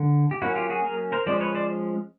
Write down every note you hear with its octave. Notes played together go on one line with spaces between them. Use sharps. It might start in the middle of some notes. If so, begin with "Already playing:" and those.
Already playing: D3
G4
F#3 A#3 C#4 E4 F#4
F4 G4
F#4 G#4
G#4 A#4
A#4 C5
F3 G#3 C#4 C5 D5
B4 C#5
C5 D5